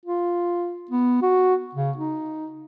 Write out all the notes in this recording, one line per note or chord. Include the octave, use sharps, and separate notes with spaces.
F4
B3
F#4
C#3
D#4